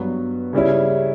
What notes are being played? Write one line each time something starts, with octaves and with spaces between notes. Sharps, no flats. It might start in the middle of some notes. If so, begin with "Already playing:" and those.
Already playing: G2 F#3 B3 F#4 B4
C#3 G3 C#4 E4